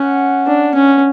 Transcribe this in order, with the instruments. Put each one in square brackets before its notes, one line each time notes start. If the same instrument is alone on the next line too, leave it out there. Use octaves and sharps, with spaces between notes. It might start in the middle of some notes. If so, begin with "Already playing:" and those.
Already playing: [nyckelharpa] C#4 [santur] F#5
[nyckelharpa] D4
C#4